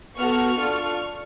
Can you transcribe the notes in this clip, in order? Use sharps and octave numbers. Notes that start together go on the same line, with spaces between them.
B3 F#4 A4 C#6 F6
D4 F4 A4